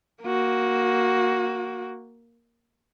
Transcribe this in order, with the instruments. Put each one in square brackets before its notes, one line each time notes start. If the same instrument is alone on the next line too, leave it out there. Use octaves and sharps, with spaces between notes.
[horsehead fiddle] A#3 F#4